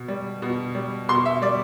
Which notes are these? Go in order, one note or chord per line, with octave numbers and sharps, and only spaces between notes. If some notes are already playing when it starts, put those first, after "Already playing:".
Already playing: B2
G3
B2
G3
B2 C6
E5
G3 D5